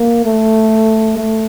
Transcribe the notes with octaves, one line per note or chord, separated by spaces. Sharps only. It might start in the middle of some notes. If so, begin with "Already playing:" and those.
Already playing: A#3
A3
A3